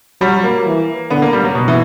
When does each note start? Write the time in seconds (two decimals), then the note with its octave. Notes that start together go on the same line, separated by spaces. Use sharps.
0.21 F#3 G3
0.44 A#3
0.66 E3
1.10 D3 B3
1.22 A#3
1.33 G3
1.44 F#3
1.55 B2
1.68 E3